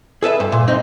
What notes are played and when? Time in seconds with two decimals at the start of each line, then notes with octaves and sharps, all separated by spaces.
0.23 G#4 A4 B4 E5
0.40 G2
0.52 A#2
0.68 G2 C4 D#4